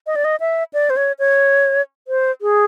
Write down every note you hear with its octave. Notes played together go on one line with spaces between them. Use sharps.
D#5
D5
D#5
E5
D5
C5
C#5
C#5
C5
G#4